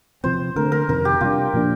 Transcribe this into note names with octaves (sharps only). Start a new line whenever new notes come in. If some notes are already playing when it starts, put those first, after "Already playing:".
C3 F3 C4 C5
D3 A3 C4 A#4
A#4
F2 C3 D#3 A#4
G4
C3 G3 D4 F4
A#2 F3 A#3 D4